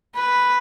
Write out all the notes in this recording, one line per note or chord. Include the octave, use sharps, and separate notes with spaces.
B4